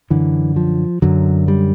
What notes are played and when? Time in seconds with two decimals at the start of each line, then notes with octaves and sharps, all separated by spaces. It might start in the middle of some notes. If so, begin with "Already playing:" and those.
0.10 F#2 D3 E3
0.56 F3
1.02 F#2 D3 F#3
1.48 G3